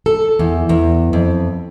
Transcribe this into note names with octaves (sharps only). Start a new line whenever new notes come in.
A4
E2
E2
F2